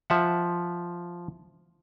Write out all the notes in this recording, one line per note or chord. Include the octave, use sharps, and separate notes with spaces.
F3 E5 F#5